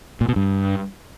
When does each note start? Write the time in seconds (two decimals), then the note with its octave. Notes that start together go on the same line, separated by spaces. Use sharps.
0.21 A#2
0.28 B2
0.36 G2